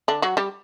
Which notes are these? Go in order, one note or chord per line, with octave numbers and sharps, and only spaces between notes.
D3 D4
F#3 F#4
G3 G4